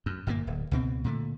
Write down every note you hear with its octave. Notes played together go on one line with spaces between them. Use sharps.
F#2
G1 A#2 C#3 A#3
D1
C#2 B2 C4
A#2 D3 G#3 A3